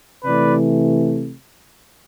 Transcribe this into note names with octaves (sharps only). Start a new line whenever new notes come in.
C3 E3 A3 B4 D5